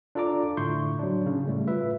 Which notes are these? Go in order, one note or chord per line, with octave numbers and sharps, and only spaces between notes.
D4 F4 A4 D5 A#5 D6
A2 D3 E4 C6 C#6 G6
F#3 D4
C#3
A2 G3 A3
F4 B4 E5